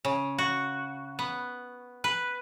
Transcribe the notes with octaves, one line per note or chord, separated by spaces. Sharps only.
C#3
F#4
B3
B4